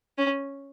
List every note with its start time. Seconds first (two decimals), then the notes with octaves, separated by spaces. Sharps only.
0.18 C#4